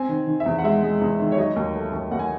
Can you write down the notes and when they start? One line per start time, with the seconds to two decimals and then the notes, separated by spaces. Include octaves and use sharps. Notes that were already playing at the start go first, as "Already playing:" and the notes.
Already playing: C4 G#5
0.09 D#3
0.27 D#3
0.40 E5
0.46 E2
0.58 F#5
0.64 G#3 E5
0.83 G#3
1.01 E2
1.20 D#3
1.32 C#5
1.37 F#3 D#5
1.56 D#2
1.75 A3
1.93 D#2
2.11 D#2 F#5
2.19 G#5